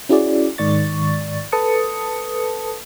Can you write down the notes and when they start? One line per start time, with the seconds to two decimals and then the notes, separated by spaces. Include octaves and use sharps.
0.09 C#4 E4 F#4 G#4 D5
0.58 G#2 D#3 D5 C#6 A6
1.52 A4 B4 A5 D#6 C#7